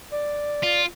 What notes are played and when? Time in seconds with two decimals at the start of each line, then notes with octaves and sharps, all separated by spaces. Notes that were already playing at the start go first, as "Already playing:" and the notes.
0.12 D5
0.63 F4